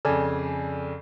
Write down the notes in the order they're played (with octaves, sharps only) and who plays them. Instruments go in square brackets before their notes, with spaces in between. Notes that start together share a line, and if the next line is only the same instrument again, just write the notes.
[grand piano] F2 C#3 [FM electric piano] A4 D5 G#5